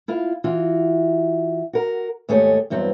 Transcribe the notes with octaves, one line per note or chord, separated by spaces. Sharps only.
E4 F4 F5
E3 F4 F#4
F#4 A#4
D#2 G#2 A3 G4 G#4 C#5
E2 G2 F#3 C4